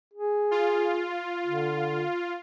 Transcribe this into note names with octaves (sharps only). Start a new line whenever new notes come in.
G#4
F4
D3